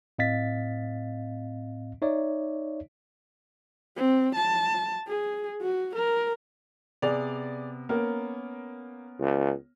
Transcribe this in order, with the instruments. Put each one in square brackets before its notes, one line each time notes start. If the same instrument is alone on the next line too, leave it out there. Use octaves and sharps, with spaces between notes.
[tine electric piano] A2 C4 D#5 F5 A6 B6
D#4 C#5 D5 E5
[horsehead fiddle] C4
A5
G#4
F#4
A#4
[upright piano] C3 B3 F7 [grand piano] G#4 D5
[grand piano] A#3 [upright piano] B3 C#4 A#4
[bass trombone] C#2